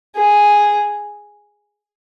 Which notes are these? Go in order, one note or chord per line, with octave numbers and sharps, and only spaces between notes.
G#4